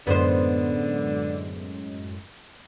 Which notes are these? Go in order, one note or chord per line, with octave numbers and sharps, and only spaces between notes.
F#2 A2 D3 G#3 B3 C5